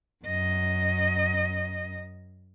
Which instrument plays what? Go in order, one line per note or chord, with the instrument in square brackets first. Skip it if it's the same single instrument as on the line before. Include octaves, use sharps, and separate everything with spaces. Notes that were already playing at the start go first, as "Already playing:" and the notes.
[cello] F#2 D#5